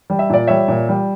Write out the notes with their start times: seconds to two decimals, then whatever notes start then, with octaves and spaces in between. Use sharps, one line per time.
0.10 G3
0.19 E5
0.30 A#2 D5
0.47 G3 C#5 E5
0.68 A#2
0.89 G3